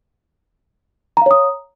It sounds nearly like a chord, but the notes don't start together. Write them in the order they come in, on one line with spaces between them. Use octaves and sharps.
A#5 F5 C#5 D#6